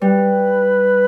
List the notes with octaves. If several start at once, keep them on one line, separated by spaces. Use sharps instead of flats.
G3 B4